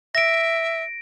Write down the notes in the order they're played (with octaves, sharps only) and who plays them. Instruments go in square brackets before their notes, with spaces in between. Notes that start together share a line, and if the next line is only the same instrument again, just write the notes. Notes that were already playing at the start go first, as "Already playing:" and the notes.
[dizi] E5 [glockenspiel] A#6 D7